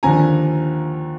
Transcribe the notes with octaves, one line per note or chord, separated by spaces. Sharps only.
D#2 D3 F3 G#5 A#5